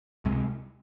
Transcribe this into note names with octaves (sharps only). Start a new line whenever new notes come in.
C#2 C3 G#3